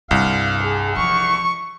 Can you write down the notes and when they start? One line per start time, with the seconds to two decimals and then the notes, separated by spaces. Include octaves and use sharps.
0.11 C2 G2 F5
0.63 G#4
0.96 E3 F3 C#6